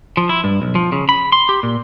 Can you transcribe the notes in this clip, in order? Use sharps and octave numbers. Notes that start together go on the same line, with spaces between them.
F3
E4
G2
B1
F3
C#3
B5
C6
G4
A#2